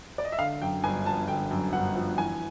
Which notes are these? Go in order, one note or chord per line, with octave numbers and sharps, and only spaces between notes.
D5
D#5
E5
D3 F5
F#2 G5
G1 G#5
F3 A5
D3 G5
F#2
G1 F#5
F3
E3 G#5